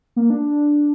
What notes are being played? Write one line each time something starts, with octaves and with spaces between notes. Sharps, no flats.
A#3
D4